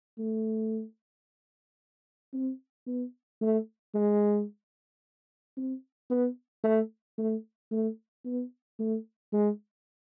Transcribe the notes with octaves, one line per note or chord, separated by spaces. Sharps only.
A3
C4
B3
A3
G#3
C4
B3
A3
A3
A3
B3
A3
G#3